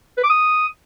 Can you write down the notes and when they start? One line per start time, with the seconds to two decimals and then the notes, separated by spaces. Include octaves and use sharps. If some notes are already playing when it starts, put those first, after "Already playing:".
0.17 B4
0.24 D6
0.30 D#6